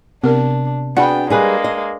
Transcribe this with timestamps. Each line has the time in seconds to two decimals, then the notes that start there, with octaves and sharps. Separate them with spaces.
0.24 C3 B3 D4 A#4
0.97 B3 D4 F#4 G#4 F#5 G5 B5
1.30 G3 G#3 A#3 G#4 B4
1.64 D#5